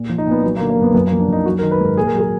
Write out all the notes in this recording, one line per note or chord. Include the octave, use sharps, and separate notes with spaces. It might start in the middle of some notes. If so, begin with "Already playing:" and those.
Already playing: A#2
F3
D#4
A#2
B3
F#3 B3
A#3
D3
A#3
F#2 B3
F#2 B3
A#3
F3
D4
F#2 D#4
F#3 F#4
A#4
D#3
B4
G#2 A#4
A#2 G#4
A#4
F#3 G#4